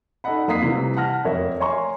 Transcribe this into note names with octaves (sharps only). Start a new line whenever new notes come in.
D#4 A4 D5 D#5 F#5 B5
F2 A#3 A#5 D#6 B6 C7
C3 E3 G3
F#5 A5 F6 A#6
E1 F2 A#4 C#5 E5
C#5 G#5 A#5 C6 C#6